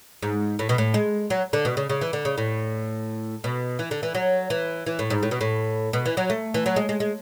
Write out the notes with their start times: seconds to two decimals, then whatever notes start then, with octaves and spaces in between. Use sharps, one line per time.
0.22 G#2
0.59 A2
0.69 B2
0.78 A2
0.94 G#3
1.30 F#3
1.53 D3
1.65 B2
1.77 C#3
1.89 C#3
2.01 E3
2.13 D3
2.25 C#3
2.38 A2
3.44 B2
3.79 E3
3.91 D3
4.03 E3
4.15 F#3
4.50 E3
4.86 E3
4.99 A2
5.10 G#2
5.23 A2
5.31 B2
5.41 A2
5.93 B2
6.06 E3
6.17 F#3
6.30 A3
6.54 E3
6.66 F#3
6.76 G#3
6.89 G#3
7.00 G#3